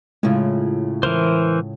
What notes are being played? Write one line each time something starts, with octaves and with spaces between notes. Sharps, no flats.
A2 C#3 G#3 E4 F4
E3 A#4 C5